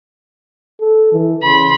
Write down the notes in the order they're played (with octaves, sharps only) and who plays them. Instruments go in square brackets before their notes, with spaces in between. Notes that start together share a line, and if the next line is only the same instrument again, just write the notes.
[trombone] A4
E3
[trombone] C#3 [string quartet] B5 C6